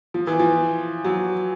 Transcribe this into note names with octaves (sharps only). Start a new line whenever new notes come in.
F3
E3
F3
F#3